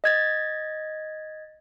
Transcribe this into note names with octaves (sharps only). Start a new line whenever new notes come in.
D#5 G#6 A6